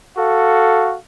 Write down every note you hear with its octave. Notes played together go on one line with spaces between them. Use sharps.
F#4 A4 F5